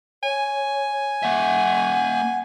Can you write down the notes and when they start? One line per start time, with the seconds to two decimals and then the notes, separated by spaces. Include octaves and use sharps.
0.23 C#5 G#5
1.23 A#3 E5 F#5